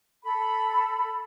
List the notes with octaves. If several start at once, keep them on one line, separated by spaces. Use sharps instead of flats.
A4 B5